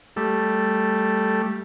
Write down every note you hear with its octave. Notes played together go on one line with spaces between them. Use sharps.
G3 A3